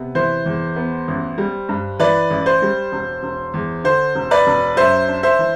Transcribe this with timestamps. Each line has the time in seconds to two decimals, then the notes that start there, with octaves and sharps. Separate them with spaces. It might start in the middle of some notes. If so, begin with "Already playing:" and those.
Already playing: C3 B3
0.15 E3 C5
0.46 E2
0.76 B3
1.08 A1
1.38 G3
1.69 G2
1.99 E3 B4 D5
2.31 A1
2.46 C5
2.62 G3
2.92 E1
3.23 E1
3.54 E2
3.84 D3 C5
4.15 E1
4.31 B4 D5
4.47 E1
4.76 F#2 C5 E5
5.08 D4
5.23 C5 E5
5.39 E3